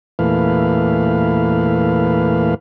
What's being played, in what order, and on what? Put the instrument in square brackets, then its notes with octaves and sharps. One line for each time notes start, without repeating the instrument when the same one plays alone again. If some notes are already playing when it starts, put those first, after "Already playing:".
[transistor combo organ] E2 A#2 E3 A3 B4 F5